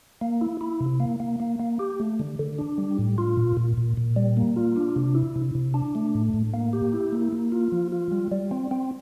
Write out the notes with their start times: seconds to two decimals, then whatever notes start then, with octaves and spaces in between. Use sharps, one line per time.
0.21 A#3
0.41 E4
0.61 E4
0.81 C3
1.00 A#3
1.20 A#3
1.40 A#3
1.60 A#3
1.79 G4
2.00 A3
2.19 D3
2.39 D3
2.58 D4
2.78 G3
2.98 A2
3.18 F4
3.37 A#2
3.57 A#2
3.77 A#2
3.97 A#2
4.16 G3
4.37 A#3
4.56 F4
4.76 D4
4.96 C3
5.15 E4
5.36 C3
5.55 C3
5.74 D4
5.95 A3
6.15 A2
6.34 A2
6.54 A#3
6.73 G4
6.93 E4
7.12 A#3
7.32 A#3
7.52 F4
7.72 F3
7.92 F4
8.11 G3
8.32 G3
8.51 C4
8.71 C4